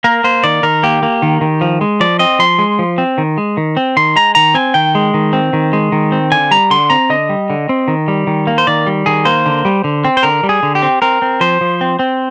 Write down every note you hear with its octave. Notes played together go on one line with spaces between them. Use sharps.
A#3 A#4
A#3 C5
D#3 D5
D#3 A#4
A#3 G4
A#3
D#3
D#3
F3
G#3
F3 D5
C4 D#5
F3 C6
G#3
F3
C4
D#3
G#3
D#3
C4
D#3 C6
G#3 A#5
D#3 A#5
C4 G#5
D#3 G5
G#3
D#3
C4
D#3
G#3
D#3
C4
D3 G#5
G3 A#5
D3 C6
C4 A#5
D3 D#5
G3
D3
C4
D#3
G3
D#3
A#3
C5
D#3 D5
G3
D#3 G#4
A#3 C5
D3
G3
D3
C4
C5
D3 A#4
G3
G#4
D3
G4
C4
C4 A#4
C4
F3 C5
F3
C4
C4